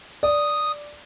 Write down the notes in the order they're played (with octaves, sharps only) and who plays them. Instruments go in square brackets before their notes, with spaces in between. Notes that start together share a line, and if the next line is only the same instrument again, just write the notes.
[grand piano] D5 [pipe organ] D#6